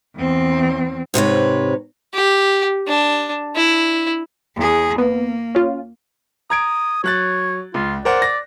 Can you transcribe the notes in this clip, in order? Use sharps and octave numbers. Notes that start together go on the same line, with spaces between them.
E2 C4
G#2 C3 B4 C#5
G4
D4
E4
E2 G#4
A#3 B3
C#4 F4
A#5 D#6 G#6 D7
F#3 C#5 F#6 A6
C#2 F4
A#4 C5 D5 F#5
A#6